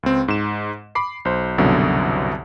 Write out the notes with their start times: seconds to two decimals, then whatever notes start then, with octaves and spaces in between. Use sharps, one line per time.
0.03 C#2 C4
0.28 G#2 E7
0.95 B5 D6 C7
1.25 B1 C5
1.58 C2 F#2 B2 D3 F#3